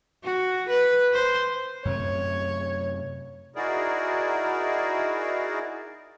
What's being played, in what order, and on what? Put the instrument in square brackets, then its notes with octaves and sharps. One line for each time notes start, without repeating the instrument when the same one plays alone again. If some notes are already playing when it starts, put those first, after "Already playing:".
[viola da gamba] F#4
B4
C5
[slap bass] F#2 C3 A3 [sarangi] C#5
[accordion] D#4 E4 F#4 G#4 A#4 D5